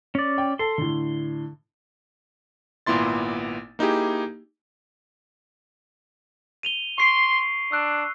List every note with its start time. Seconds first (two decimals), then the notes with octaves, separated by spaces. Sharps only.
0.15 C#4 D5
0.38 G5
0.59 A4 C6
0.78 A2 D3
2.86 G#1 A#2 B3 E4 C6 A6
3.79 A#3 D#4 E4 G4 G#4
6.63 D#7 F7 G7
6.98 C6 C#6 C7 D7
7.72 D4 E6 F#6